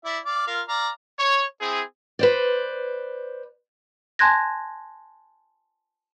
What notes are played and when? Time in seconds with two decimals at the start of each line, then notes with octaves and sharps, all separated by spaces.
0.05 E4 D5 E5
0.25 D5 F5 D6
0.47 F4 A#4 F5
0.68 D5 F5 A#5
1.19 C#5
1.60 C4 E4 G#4
2.19 B4 C5 D5
4.19 G#5 A5 C6 F#6 G#6 A#6